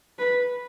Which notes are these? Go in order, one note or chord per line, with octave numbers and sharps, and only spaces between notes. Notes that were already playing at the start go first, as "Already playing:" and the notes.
B4